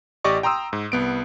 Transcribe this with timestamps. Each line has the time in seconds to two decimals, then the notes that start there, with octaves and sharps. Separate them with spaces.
0.24 A1 G4 D5 D#5 C#6
0.43 G5 A#5 C6 D#6 E6
0.73 G#2
0.92 C2 B3 D7